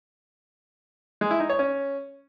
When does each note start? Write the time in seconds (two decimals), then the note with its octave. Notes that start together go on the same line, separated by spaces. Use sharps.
1.21 G#3
1.31 E4
1.40 D#4
1.50 C#5
1.59 C#4